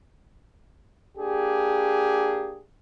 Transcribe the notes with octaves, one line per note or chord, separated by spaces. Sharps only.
A#3 D4 G4 G#4